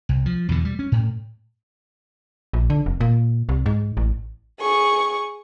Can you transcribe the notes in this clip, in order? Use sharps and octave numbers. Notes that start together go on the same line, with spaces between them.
C2
F3
E2 B2 D3
G3
C#4
A2
A#1
D3
F1
A#2
C2
G#2
A1
G#4 C#6